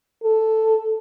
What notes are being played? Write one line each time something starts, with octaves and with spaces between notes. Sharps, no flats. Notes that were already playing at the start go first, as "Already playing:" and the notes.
A4